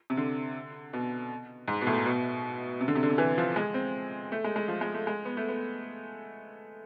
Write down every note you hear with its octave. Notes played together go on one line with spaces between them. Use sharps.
C3
D3
B2
G#2
B2
A2
B2
C3
D3
C3
D3
C3
E3
F3
G#3
C4
A3
G#3
G#3
F3
G#3
A3
G#3
B3
A3
B3